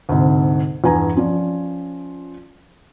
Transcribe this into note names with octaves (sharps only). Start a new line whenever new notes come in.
D2 G#2 C3
E2 G2 G#5 A#5
F3 C#4 D5